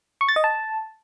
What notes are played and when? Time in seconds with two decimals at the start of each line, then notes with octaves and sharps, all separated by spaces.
0.21 C#6
0.29 A6
0.36 D#5
0.44 A5